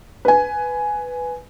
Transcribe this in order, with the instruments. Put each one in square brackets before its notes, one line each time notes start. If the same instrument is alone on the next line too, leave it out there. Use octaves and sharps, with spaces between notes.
[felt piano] B4 G#5